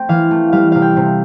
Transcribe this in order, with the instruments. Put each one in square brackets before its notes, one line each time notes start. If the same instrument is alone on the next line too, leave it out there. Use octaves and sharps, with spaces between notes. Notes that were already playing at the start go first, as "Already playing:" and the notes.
Already playing: [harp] A3 C4 G5
E3 F5
A3
G3 F5
C3 F5
G5
C3